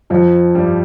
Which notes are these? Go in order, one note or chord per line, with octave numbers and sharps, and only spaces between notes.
F2 F3
G2 G3